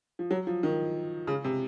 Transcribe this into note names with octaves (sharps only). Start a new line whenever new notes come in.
F3
F#3
F3
D#3
C#3
C3